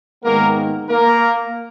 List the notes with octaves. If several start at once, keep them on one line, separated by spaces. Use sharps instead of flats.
G#2 D#3 G#3 A#3 B3 A#4
A#3 A#4